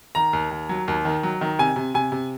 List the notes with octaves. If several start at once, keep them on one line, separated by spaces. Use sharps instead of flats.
D#3 A#5
D#2
D#2
F#3
D#2
D#3
F#3
D#3
C3 G#5
C3
C3 G#5
C3